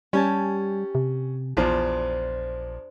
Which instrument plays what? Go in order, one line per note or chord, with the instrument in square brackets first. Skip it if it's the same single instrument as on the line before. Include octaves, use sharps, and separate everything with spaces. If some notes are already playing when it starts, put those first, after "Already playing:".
[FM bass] G3 [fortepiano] C#4 [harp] G4 G#5 A5
[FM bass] C3
[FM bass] A#1 [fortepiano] E2 F3 [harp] D4 C5